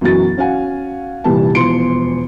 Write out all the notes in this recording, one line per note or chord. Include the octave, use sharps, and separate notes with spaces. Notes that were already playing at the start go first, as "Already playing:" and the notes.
F#2 B2 E3 F#3 F#4 A6
C#4 F#4 F5 F#5 G#5
F1 A#2 E3 G3 G4 A5
E1 E2 F3 C6 C#7 D7